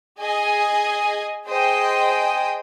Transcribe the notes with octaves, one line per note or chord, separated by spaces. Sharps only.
G#4 D#5 G#5
G#4 C5 D#5 G5